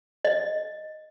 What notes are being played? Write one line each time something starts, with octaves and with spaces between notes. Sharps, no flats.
D#5